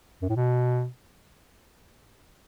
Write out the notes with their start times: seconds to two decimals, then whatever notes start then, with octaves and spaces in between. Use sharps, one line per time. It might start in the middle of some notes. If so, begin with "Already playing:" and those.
0.22 F#2
0.29 A2
0.36 B2